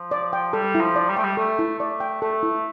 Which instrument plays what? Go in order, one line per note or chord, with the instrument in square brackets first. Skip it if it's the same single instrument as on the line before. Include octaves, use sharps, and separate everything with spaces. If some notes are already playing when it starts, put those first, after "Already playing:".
Already playing: [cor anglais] F3
[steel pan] D5
G5
[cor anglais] G3 [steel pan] A4
[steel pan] E4
[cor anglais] F3
[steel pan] D5
[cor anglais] G3
[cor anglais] A3 [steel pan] G5
[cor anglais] G3
[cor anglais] A3 [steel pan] A4
[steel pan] E4
[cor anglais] A3 [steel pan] D5
[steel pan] G5
[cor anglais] A3 [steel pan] A4
[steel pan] E4